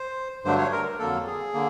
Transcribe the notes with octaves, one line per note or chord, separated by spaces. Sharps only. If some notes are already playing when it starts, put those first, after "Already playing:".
Already playing: C5
G2 D3 F#3 A3 D4 C5
C#5
A#4
F2 D3 F#3 A#3 A4
G#4
D3 A#3